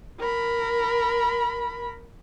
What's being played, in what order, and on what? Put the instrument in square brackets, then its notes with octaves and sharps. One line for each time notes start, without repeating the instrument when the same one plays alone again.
[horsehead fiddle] A#4 B5